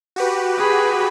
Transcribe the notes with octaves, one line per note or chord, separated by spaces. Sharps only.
F#4 G4 B4
G#4 B5